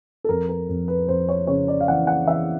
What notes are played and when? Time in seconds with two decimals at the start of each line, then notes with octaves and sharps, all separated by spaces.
0.24 A4
0.29 F2 A#4
0.49 A#4
0.69 F2
0.88 B4
1.08 F2 C5
1.29 C#5
1.47 C#3 C#5
1.68 D5
1.81 F5
1.88 E3 F#5
2.07 F#5
2.27 E3 E5